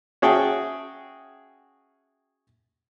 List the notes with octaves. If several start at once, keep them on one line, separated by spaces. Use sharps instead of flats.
C#4 F#4 G#4 E5 G5 A5